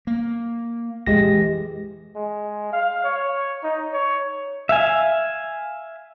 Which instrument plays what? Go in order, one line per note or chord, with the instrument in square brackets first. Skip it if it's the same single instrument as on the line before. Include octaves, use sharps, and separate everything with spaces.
[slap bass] A#3
[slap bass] A#1 F2 F3 [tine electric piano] G#3 G4 A#6
[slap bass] E3
[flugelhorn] G#3
F5
C#5
D#4
C#5
[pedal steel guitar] E5 F5 G#5